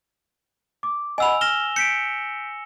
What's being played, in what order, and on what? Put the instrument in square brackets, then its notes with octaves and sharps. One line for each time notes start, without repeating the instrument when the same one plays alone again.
[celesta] D6
[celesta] D#5 F#5 B5 [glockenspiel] G#5 E6 F7
[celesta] F6 [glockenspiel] A#6 E7 G7
[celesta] G6 B6 D7 [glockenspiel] C#7